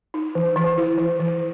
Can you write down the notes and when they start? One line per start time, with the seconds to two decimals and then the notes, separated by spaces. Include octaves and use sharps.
0.14 D#4
0.35 E3
0.56 E3
0.78 E4
0.98 E3
1.20 E3